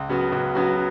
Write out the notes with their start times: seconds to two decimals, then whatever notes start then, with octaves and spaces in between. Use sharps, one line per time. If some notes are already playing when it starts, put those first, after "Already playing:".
Already playing: C#2
0.09 C#3 F#3 B3 F#4
0.32 C#2
0.55 C#3 F#3 B3 F#4